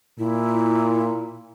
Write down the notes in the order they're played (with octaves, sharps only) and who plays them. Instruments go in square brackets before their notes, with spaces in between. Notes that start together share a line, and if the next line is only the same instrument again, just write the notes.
[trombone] A#2 [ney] E4